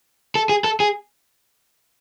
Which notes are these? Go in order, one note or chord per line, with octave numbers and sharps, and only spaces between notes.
A4
G#4
A4
G#4